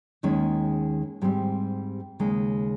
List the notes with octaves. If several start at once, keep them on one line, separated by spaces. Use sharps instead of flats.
D#2 D#3 G#3 C#4 G#4
G#2 G3 C4 G4
D#2 C#3 G#3